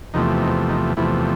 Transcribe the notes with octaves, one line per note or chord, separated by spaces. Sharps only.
E2 C3 F3 A3 D#4
D#4
D#4
E2 C3 F3 A3 E4